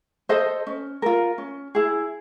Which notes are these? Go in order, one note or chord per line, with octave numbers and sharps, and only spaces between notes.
A4 C5 D#5
C#4
F4 A#4
C#4
E4 G#4